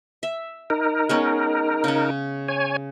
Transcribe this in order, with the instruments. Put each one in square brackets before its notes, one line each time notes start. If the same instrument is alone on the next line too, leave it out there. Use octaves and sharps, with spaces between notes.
[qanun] E5
[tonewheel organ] D#4 A#4
[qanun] G#3 B3 C#4
C#3 C#4
[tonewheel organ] C#5 G#5